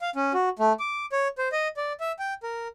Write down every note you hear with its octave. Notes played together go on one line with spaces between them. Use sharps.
F5
C#4
F#4
A3
D6
C#5
C5
D#5
D5
E5
G5
A#4